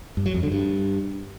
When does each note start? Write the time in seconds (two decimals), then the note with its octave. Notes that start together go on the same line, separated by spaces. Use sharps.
0.17 G2
0.26 F#3
0.34 F2
0.43 D3
0.52 G2